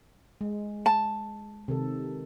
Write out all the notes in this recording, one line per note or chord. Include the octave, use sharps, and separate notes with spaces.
G#3
A5
C3 D#3 A4